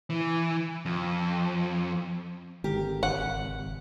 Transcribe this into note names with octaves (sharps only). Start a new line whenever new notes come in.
E3
F2
G#1 D3 G4 A#4
F#1 F#5